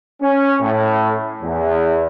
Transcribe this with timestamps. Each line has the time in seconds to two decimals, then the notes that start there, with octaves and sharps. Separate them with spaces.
0.21 C#4
0.60 A2
1.42 E2